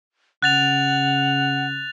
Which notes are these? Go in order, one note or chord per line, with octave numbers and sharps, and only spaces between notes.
C#3 F#5 F#6 A6 F7